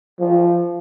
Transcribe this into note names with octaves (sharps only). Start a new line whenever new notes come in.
F3